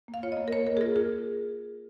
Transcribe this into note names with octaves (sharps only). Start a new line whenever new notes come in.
A#3
F5
F4 C#5
D#5
A#3
A#4
A#3 C#5
A#3 A#4
G#4
F4 A#4
F4 G#4